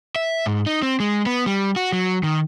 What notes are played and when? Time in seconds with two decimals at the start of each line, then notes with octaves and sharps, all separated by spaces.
0.16 E5
0.46 G#2
0.66 D#4
0.82 C4
1.00 G#3
1.26 B3
1.46 G3
1.76 F#4
1.93 F#3
2.23 D#3